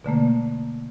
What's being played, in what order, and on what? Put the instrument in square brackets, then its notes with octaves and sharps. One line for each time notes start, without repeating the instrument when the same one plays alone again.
[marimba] B2 D3 A3 A#3